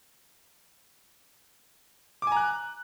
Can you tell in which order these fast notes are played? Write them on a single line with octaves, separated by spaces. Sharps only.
D6 G#5 A#5 F#6